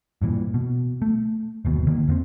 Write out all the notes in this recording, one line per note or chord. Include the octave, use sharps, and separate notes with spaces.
G2 A#2 E3
B2
A3
G1 D#2 B2
D3 D#3 A#3
E2 B3 C4